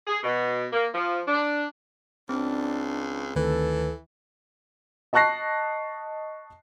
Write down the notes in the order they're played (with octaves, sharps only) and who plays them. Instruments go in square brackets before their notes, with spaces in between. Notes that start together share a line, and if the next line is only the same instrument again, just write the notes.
[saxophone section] G#4
B2
A#3
F3
D4
[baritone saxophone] C#2 [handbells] C4 [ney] D4
[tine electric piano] D2 D#3 B4 [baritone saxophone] E3 [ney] A4
[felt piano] D#5 A5 C#6 F#6 A#6 C7